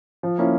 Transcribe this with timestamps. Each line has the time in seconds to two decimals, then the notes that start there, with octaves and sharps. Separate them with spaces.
0.23 F3
0.38 A#3 C#4 E4